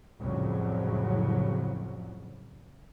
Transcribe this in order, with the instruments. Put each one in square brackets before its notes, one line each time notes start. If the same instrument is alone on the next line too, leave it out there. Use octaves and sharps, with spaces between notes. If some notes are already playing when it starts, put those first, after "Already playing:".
[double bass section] C2 F2 A2 C#3 F3 F#3